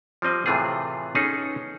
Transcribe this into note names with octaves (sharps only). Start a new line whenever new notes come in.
F3 G3 C4 D#5
A2 C3 E3 A3 F4 G#4
B3 C#4 D#4 G#4 A4